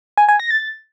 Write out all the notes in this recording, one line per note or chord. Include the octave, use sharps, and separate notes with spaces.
G#5
G#5
A#6
A6